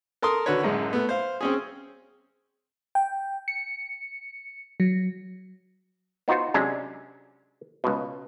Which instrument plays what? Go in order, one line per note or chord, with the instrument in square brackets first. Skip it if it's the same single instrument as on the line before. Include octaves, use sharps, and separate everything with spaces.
[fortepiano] A4 A#4 A5 C6 D#6
D3 F#4 B4 C#5
A1 F#2 G#3
A3 B3
C5 F5
C4 C#4 G#4
[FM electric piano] G5
C#7
F#3
[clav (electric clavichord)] B3 D#4 F4 F#4 C5
C3 F#3 G#3 C#4 D4
C#2 B2